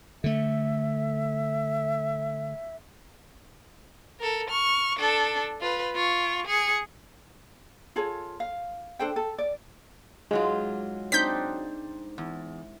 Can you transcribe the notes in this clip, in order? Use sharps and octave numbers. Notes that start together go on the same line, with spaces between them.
D3 A3 E5
A4 A#4
C#6 F6
D4 A4
F4 B4
F4 C#6
G#4 C#7
F4 G#4 A4 C#5
F5
D4 A4 C5 G5
A4
D5
G#2 F#3 G#3 F4
C4 D4 D#4 G6 B6
E2